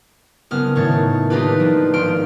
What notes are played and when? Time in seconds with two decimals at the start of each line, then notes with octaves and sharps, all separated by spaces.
0.51 F#1 B3 F6
0.75 A2 D#3 A3 C#5 A6
1.30 A#3 D4 D#4 F4 G4 B4
1.60 F3
1.94 G#1 D#3 C6 F6 D7